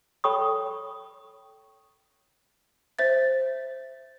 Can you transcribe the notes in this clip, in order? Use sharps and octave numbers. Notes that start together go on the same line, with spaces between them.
A4 C#5 G5 B5 C#6 D#6
C5 E5 A6